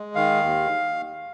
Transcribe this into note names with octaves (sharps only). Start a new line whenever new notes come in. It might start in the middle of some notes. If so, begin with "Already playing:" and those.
Already playing: G#3
D#3 F5
D#2